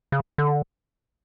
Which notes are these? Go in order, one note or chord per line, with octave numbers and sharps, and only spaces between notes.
C#3
D3